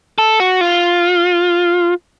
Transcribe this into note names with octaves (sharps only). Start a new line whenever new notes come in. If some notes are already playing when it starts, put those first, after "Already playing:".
A4
F#4
F4